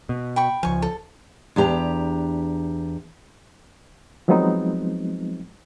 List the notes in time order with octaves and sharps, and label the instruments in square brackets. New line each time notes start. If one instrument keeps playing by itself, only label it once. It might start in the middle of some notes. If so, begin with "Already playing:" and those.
[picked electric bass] B2
[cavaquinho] G5 B5 C#6
[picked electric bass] C#2 F3 [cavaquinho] G#5 C#6
[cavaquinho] A4
[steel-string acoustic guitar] E2 D4 G4 A#5
[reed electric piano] F3 F#3 G#3 B3 C4 D#4